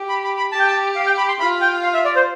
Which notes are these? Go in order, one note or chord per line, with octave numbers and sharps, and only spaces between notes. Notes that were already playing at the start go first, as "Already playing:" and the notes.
Already playing: G4
B5
B5
B5
G4 A5
G5
A5
F5
G5
B5
C6
F4 B5
G5
F5
E5
D5
C5